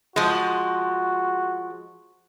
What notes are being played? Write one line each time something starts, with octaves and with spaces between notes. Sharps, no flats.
F3 G#3 F#4